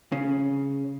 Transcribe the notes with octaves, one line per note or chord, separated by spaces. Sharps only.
C#3